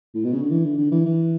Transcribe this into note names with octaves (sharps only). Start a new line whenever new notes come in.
A2
B2
C#3
D3
E3
D3
D3
E3
E3